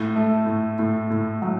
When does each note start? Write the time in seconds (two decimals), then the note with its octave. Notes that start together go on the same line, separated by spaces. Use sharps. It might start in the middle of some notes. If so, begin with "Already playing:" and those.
Already playing: A2
0.16 A3
0.46 A2
0.79 A2
1.10 A2
1.42 F#3